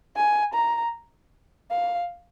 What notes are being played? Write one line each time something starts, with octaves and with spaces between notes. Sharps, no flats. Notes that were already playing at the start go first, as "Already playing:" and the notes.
G#5
A#5
F5